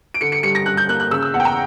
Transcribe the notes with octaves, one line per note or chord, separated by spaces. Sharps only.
D7
D3 C#7
C#7
G2 C#7
A#6
G2 F#6
G6
A#3 F#6
F#6
C#3 E6
E6
E2 F#5
G5
A#5